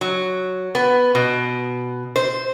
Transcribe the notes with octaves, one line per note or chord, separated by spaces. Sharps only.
F#3
B3
B2
C5